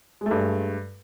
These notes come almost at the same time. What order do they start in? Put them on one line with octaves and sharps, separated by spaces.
G#3 A3 G2